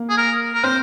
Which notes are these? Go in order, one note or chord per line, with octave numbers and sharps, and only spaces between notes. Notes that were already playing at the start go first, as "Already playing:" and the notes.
Already playing: A#3
G#4
A#4
A#4
C4 C5